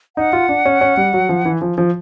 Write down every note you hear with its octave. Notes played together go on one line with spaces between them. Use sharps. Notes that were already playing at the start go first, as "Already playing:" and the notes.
D#4 F#5
F4
D4
C#4
C#4
G3
F#3
F3
E3
F3
F3